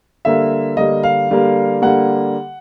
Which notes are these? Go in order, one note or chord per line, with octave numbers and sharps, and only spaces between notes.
D3 G3 A#3 E5
D3 G3 A#3 D#5
F5
D3 G3 A#3
D3 G3 A#3 F#5